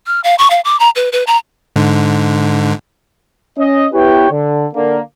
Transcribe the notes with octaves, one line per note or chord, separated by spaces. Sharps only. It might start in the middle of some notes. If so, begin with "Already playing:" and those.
F6
F5
C#6
F5
D6
A#5
B4
B4
A#5
G#2 D3
C#4 D#5
B3 E4 G4 B4 C#5 G5
D3
D3 A#3